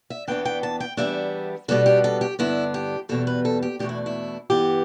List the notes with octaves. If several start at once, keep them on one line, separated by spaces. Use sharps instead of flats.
E5
E2 E3 B3 D4 G5
G5
A5
G5
E2 E3 G3 B3 D4 E5
B2 G3 B3 D4 A4
G4
A4
G4
G2 D3 B3 D4 E4
G4
E2 B2 G3 A4
B4
A4
G4
E2 B2 A3 D4 G4
E4
E4
G2 E3 B3 G4